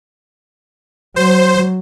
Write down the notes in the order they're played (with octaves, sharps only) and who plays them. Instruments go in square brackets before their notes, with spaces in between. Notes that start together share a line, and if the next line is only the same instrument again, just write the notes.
[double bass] F#3 [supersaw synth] C5